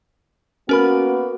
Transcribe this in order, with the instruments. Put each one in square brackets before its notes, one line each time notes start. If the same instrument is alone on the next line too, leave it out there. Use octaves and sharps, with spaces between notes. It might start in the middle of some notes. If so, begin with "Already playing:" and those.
[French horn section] A#3 B3 F#4 [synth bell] C#4 A#4 B5